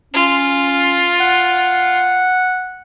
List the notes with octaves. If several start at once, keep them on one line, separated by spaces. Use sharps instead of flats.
C#4 F4
F#5